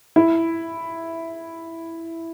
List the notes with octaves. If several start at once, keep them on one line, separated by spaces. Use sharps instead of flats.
E4